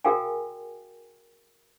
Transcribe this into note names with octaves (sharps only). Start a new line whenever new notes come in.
F#4 G#4 A#4 F5 G5 G#5